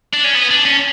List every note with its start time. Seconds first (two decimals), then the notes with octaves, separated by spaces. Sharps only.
0.13 D4
0.24 C#4
0.35 B3
0.50 D4
0.65 C#4